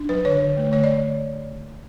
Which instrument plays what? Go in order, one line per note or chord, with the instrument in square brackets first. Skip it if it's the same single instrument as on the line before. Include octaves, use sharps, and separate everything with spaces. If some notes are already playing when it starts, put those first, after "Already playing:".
Already playing: [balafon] D4
F#3 B4
D3 C#5
D3
A3
D3 C#5
D5